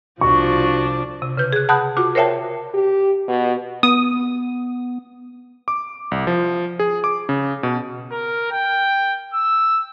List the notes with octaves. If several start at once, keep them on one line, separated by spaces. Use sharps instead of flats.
C2 F3 D4 F#4 C#6
C3
C#3 B4 G6
G#4 F#6
F#5 A5 B5 D#6 F#6 G6
F4 F#4 D6
A#4 C5 C#5 E5 G5 A5
G4
B2
B3 D#6
D6
C2
F3
G#4
D6
C#3
B2
A#4
G5
E6